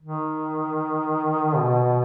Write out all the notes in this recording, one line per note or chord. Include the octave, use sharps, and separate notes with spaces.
D#3
B2